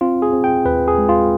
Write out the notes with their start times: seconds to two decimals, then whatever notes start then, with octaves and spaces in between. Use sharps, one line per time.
0.01 C4 F4
0.22 G#4
0.33 C4
0.44 G5
0.65 D#2 B4
0.88 G#4
0.98 G#3
1.09 F4